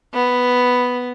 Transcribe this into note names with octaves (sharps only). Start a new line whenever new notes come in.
B3